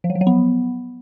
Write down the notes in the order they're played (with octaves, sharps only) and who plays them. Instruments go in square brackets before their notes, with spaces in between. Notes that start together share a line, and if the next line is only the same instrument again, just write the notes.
[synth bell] F3
F#3
F3
F#3
B3